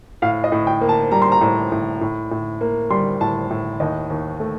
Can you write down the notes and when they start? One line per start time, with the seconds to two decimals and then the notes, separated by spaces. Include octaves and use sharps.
0.22 A2 F5
0.44 D#5
0.52 A2
0.67 G5
0.81 A#3
0.89 A5
1.11 G3 A#5
1.22 C6
1.32 A#5
1.41 A2
1.72 A2
2.01 A2
2.31 A2
2.61 A#3
2.90 G3 C6
3.21 A2 A5
3.51 A2
3.80 D#2 D#5
4.10 D#2
4.40 A3